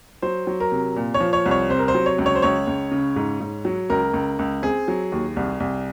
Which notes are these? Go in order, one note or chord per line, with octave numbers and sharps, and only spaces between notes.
F#3 C5
F#3
A#4
C3
A#2
C#5
F3
C#5
C2
C#5
C3 C5
A#4
C5
F#3
C#5
C#2
C#5
C5
C#2 C#5
C#2
C#3
G#2
G#2
F#3
C#2 A#4
C#2
C#2
C4 G#4
F#3
D#2
C2
C2